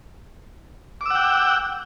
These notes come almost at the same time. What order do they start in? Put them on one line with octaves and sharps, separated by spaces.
D6 E6 F#5 G5